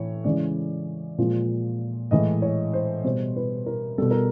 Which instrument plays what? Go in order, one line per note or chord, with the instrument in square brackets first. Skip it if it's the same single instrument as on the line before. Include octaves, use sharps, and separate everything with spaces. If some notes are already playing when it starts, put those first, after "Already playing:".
Already playing: [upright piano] A2 E3 C#5
C#3 E3 G#3 D5
A#2 F3 G#3
A2 E3 G#3 D#5
C#5
C5
B2 G3 C5
B4
A#4
B2 G3 A4
A#4